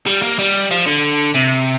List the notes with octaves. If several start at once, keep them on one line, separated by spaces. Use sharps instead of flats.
G3
A#3
G3
F3
D3
C3